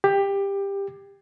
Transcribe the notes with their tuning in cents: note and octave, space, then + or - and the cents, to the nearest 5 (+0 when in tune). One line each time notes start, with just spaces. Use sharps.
G4 +15